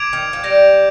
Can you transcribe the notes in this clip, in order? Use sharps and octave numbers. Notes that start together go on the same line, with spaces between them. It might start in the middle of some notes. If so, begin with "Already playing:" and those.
Already playing: D6 G#6 D7 F7
D#3
F3
G3 G6 A#6 D7 F7